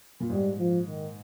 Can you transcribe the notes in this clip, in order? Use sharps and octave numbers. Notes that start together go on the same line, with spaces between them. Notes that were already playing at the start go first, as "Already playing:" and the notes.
A#2
G#2 G3
F3
D#3